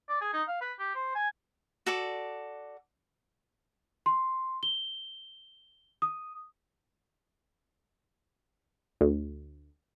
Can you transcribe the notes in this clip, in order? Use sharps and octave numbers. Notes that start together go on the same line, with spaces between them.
D5
G#4
D#4
F5
B4
G4
C5
G#5
F#4 A4 D5
C6
G7
D#6
D2